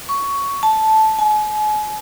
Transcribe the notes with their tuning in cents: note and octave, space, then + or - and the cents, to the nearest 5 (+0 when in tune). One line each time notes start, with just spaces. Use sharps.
C#6 +10
A5 -10
G#5 +40